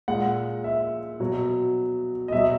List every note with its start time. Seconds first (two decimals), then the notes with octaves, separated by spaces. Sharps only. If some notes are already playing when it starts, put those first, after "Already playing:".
0.08 A#2 G#3 F#5
0.64 E5
1.20 B2 F#3
2.28 D#5
2.32 B2 F#3 E5